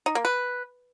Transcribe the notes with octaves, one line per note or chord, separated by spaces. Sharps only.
D#4
A#3
B4